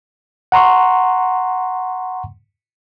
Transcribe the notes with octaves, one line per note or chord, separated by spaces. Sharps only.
F#5 A#5 C6 C#6